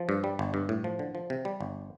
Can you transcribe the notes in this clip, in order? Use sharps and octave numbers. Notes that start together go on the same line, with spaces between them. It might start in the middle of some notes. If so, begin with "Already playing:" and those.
Already playing: F3
G2
G3
G1
G2
A2
F3
D3
F3
C3
G3
G1